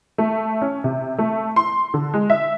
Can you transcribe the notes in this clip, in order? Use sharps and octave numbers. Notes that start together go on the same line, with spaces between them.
A3
C#4
C3
A3
C6
D3
G#3
E5